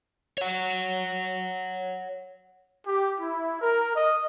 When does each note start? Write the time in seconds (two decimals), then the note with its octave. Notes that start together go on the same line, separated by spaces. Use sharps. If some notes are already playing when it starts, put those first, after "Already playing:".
0.38 C#5 F#5
2.86 G4
3.20 E4
3.61 A#4
3.95 D#5